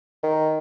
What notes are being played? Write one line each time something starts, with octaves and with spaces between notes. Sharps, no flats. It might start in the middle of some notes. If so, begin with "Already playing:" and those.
D#3